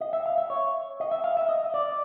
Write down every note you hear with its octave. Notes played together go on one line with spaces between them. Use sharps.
D#5
E5
F5
E5
C#5
D#5
E5
F5
E5
D#5
D5